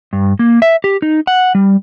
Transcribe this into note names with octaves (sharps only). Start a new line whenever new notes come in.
G2
A#3
E5
G4
D#4
F#5
G3